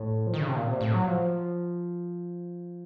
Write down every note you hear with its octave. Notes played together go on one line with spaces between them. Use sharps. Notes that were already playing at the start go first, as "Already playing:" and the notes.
Already playing: A2
F3
D#3
C#3
C3
A#2
C3
A2
F#3
F3